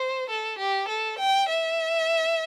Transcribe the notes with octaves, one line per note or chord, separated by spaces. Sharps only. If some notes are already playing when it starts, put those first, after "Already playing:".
Already playing: C5
A4
G4
A4
G5
E5